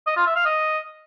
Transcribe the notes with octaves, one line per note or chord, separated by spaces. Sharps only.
D#5
F4
E5
F5
D#5